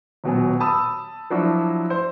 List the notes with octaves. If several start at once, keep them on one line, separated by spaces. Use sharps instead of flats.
D#1 B2 F#3 G#5
A5 B5 D#6 E6
F3 F#3 D4 E4 F#4
C5